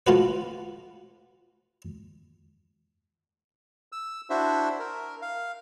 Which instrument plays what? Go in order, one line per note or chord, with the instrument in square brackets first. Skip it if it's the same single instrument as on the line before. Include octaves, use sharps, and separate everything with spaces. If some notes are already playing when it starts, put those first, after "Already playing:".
[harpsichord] A3 F4 F#4 B4
[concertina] E6
D4 E4 F#4 C5 E5
A#4
F5